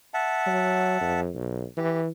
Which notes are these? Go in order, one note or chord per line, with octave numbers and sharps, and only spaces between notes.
E5 F#5 A5
F#3
F2
B1
E3 G4